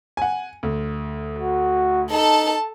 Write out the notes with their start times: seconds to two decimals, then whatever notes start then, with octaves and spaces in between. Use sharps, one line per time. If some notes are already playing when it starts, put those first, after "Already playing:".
0.17 F#5 G#5
0.63 D2
1.39 F#4
2.11 D#4 A4 A5